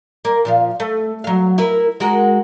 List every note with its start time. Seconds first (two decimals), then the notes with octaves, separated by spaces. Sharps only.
0.25 A#3
0.45 A#2 F3 F5
0.80 A3
1.24 F#3 F5
1.58 E4 A#4 B4
2.00 G#3 F#4 A#4